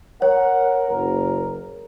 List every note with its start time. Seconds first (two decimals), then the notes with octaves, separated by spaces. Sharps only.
0.22 A#4 C#5 F#5
0.90 F#1 A#4